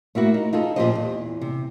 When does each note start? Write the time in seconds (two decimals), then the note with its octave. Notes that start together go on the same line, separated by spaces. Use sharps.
0.15 A3 A#3 E4 F#4
0.34 D#4
0.53 D#4 F4 G#4 A4
0.76 A#2 D#3 F3 G4 C5 D#5
0.95 E2
1.41 C3